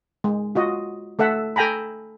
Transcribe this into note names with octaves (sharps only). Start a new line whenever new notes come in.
G#3
F4 F#4 D#5
A3 A4 E5 F#5
A4 G5 G#5 A#5 B5